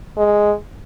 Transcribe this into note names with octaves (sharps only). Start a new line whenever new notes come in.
G#3